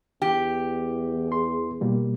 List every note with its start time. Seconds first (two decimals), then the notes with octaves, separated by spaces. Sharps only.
0.22 E2 G4
1.27 G#4 C6
1.81 B2 G3 A#3